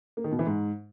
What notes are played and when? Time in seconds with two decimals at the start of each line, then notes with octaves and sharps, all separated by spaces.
0.17 A#3
0.24 D#3
0.32 B2
0.39 E3
0.46 G#2